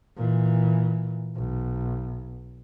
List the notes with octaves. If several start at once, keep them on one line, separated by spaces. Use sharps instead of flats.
A#2 E3
B1